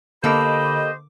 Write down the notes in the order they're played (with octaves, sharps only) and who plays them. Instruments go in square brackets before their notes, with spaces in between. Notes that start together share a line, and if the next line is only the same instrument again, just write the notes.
[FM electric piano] D3 D6 [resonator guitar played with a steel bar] A#3 A4 [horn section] G4 C5 D#5 [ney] B5